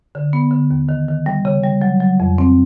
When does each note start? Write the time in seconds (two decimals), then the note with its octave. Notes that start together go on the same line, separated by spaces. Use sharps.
0.15 D3
0.33 B3
0.51 D3
0.71 D#2
0.89 D#3
1.08 D#3
1.26 G3
1.45 C#3
1.63 G3
1.82 F#3
2.00 F#3
2.20 F2
2.38 C4